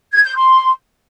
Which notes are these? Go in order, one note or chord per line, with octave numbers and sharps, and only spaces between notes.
G#6
G6
C6